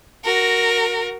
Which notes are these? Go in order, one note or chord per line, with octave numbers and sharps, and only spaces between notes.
F#4 A#4